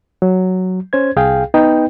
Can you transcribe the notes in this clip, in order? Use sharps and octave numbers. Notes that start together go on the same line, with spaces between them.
F#3
C#4 C5 G#6
C2 G#4 F5 G5
B3 D#4 B4 G5